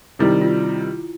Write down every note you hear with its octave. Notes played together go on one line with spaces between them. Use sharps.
C3 D#3 G3 E4
F4